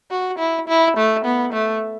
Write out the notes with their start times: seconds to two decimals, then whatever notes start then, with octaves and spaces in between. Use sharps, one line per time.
0.11 F#4
0.39 E4
0.68 E4
0.97 A3
1.25 B3
1.53 A3